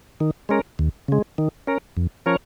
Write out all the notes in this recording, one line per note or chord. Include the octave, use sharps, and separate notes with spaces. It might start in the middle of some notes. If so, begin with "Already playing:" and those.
D#3
G#3 C#4 A#4
D#2
C#3 G#3
D#3
C#4 A#4
F2
F3 C#4 A#4 C#5